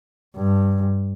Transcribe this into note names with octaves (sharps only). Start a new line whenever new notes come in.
G2